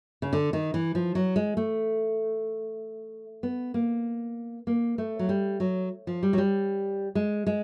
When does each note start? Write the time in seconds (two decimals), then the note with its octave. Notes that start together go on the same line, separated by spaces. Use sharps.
0.22 C#3
0.33 D3
0.53 D#3
0.74 E3
0.95 F3
1.15 F#3
1.36 G#3
1.57 A3
3.43 B3
3.74 A#3
4.67 A#3
4.98 A3
5.19 F#3
5.29 G3
5.60 F#3
6.07 F3
6.23 G3
6.33 F#3
6.38 G3
7.15 G#3
7.47 G#3